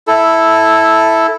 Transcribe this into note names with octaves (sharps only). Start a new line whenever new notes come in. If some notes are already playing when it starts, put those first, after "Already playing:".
E4 A4